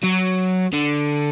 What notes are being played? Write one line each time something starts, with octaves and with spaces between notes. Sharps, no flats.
F#3
D3